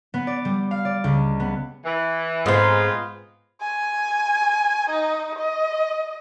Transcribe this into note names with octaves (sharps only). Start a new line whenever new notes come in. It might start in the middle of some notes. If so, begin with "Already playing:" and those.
B3
D5
G3
F5
D5
C#2
B3
E3
G#2 G#3 B3 C4 F4
G#5
D#4
D#5